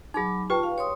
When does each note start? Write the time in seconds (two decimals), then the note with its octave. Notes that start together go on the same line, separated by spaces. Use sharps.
0.14 F#3 D#4 G#4 B5 D6
0.50 F4 G4 B4 G5 A5
0.63 F5
0.78 C#5 C6 D#6